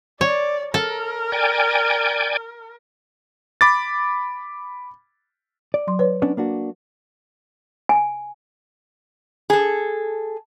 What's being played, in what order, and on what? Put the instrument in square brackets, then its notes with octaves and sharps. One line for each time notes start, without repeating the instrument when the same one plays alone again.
[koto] C#5 [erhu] D5
[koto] A4 [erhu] A#4
[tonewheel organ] D5 G5 G#5
[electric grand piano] B5 D6 A6
[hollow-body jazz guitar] D5
[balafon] F#3 C6
B4 C#5
[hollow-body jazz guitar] B3 C#4 D4
A#3 D4 F#4
[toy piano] G#5
[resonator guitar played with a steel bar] G#4 A4